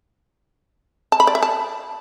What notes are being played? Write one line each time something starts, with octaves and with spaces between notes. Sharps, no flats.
A5
B5
D5
E5
A5